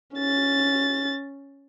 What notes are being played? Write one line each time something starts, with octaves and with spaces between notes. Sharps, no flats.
C#4 A6